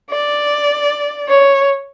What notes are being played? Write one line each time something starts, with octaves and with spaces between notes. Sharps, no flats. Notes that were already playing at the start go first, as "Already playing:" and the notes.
D5
C#5